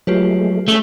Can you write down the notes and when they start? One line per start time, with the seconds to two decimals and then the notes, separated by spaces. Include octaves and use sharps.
0.07 F#3 G#3 A3 F4 G4 B4
0.68 A3 C#4 G#4